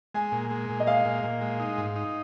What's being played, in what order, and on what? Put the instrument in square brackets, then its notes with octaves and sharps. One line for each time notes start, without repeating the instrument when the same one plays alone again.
[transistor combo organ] G#3 [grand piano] G#5
[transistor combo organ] A#2
G#3
A#2
[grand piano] D#5
[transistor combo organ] G#3 [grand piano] F5
[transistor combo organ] A#2
A#2
G#3
D#4
G#2
D#4